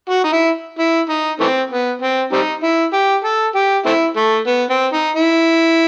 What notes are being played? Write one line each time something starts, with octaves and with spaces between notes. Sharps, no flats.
F#4
D#4
E4
E4
D#4
E3 A3 C4
B3
C4
G3 C4 D#4
E4
G4
A4
G4
A3 C4 E4
A3
B3
C4
D#4
E4